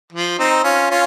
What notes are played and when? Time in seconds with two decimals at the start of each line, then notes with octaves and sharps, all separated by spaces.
0.13 F3
0.39 C4 D#4
0.64 C#4 F4
0.91 C#4 F4